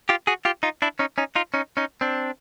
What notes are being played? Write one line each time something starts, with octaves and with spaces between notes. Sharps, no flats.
F4 G4
F#4 G#4
F4 G4
D#4 F4
D4 E4
C#4 D#4
C#4 D#4
D#4 F4
C#4 D#4
C#4 D#4
C4 D4